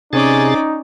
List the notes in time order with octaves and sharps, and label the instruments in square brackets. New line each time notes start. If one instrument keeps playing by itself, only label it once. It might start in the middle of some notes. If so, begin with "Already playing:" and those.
[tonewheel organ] C3 G#4 A6 [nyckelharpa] C#4 D5 [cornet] D#4